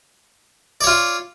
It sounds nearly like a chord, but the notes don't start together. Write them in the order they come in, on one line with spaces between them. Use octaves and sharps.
D5 C#5 F4